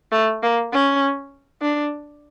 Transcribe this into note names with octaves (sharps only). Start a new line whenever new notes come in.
A3
A#3
C#4
D4